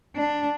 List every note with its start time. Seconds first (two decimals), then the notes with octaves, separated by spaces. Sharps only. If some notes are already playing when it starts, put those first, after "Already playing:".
0.16 D4